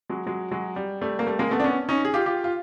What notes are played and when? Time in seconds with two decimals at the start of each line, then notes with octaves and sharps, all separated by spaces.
0.10 F#3 G#3
0.27 F#3 G#3
0.51 F#3 G#3
0.76 G3
1.01 G3 A3
1.19 A#3
1.27 G3 A3
1.39 G#3 A#3
1.51 A3 B3
1.60 D4
1.64 B3 C#4
1.89 C#4 D#4
2.05 G#4
2.14 F4 G4
2.26 F4 G4
2.44 F4